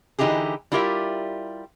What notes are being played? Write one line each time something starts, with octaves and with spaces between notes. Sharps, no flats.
D3 E3 D#4 E4 G4 G#4
G3 E4 F4 G4 A#4 E5